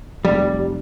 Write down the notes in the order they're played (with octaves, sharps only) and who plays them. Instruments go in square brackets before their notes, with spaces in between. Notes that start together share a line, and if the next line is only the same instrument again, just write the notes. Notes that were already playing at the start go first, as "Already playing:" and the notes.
[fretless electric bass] F1 [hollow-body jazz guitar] G3